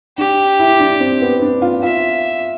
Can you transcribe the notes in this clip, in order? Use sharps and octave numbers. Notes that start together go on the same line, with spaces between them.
D4 G4
E4
D4
C4
B3
D4
F4
F4 E5